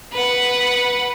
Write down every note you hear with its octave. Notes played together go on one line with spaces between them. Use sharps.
B4 F#5